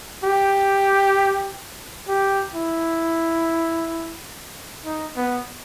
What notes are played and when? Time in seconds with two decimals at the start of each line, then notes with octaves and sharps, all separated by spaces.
0.24 G4
2.08 G4
2.55 E4
4.85 D#4
5.16 B3